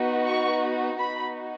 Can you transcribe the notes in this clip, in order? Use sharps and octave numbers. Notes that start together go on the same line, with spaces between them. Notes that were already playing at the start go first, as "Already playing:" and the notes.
Already playing: B3 D#4 F#4
C#6
B3 D#4 F#4 B5